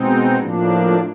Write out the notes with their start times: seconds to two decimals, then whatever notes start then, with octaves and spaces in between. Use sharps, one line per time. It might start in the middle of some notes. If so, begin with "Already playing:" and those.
Already playing: B2 G#3 C4 D#4
0.37 A2 F3 A#3 D4